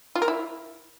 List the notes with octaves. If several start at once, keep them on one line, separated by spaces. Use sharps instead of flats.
F4
A#4
E4